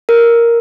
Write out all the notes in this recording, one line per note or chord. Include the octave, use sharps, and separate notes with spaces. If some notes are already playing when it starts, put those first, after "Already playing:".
A#4